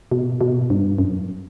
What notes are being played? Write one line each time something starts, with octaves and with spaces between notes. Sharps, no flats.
B2
B2
G2
F#2